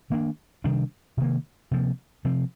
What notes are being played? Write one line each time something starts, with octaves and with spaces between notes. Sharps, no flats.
D#3 A#3 D4
C3 D#3 G3 D4
C3 D#3 A#3
C3 F3 A#3
C3 F3 C4